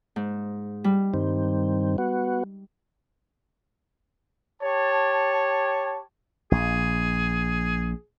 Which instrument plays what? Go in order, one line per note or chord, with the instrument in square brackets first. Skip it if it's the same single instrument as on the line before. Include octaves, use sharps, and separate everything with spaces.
[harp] G#2
G3
[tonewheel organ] G2 D#3 C4
B3 F#4
[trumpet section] G4 C#5 A5
[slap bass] A#1 [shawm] G#4